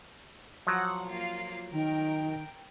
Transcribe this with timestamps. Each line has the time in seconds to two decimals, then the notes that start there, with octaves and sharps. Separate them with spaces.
0.67 F3 F#3 F#5
1.09 A#3 F4 C7
1.72 D#3 A#4 G5